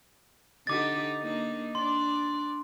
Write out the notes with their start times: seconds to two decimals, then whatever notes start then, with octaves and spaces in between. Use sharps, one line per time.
0.67 D3 D#4 G4 D6 A6
1.20 A#3 D4 D#4
1.75 D4 D5 C6